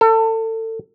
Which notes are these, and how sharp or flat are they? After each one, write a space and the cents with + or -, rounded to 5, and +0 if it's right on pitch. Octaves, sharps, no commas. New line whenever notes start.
A4 +30